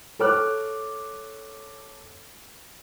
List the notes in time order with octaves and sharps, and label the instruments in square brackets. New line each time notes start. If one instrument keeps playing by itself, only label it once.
[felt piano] A4 C#5 D6 F6 F#6